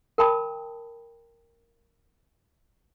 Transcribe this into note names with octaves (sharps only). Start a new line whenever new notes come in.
A#4 G5 A5 B5 D#6